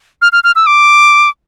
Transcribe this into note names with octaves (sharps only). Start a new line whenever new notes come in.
F6
F6
F6
E6
D6